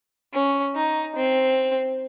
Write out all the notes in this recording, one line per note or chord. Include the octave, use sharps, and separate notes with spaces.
C#4
D#4
C4